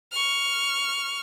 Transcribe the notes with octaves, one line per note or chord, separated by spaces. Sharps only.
C#6 F6